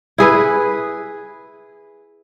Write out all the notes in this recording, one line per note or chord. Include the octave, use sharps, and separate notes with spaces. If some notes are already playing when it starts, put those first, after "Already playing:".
E4 G#4 B4